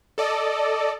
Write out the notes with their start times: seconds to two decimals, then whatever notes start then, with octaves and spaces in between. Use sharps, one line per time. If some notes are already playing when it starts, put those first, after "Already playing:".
0.18 A4 D5 D#5